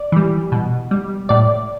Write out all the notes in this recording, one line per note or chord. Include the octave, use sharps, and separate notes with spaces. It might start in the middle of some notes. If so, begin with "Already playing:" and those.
Already playing: D5
E3 G3
B2
G3
A2 D5